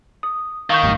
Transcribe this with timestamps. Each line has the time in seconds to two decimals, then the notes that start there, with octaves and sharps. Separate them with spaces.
0.23 D#6
0.70 D#3 F5 C#6 G6
0.83 A1 G2